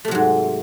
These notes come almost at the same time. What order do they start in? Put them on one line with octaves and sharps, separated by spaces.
A3 C3 F#3 G#2